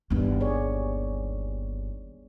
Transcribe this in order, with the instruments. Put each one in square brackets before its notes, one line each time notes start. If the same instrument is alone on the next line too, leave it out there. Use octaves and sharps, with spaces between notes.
[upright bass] G1 D#2 [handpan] G3 B3 D4
[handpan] G#4 C#5 D5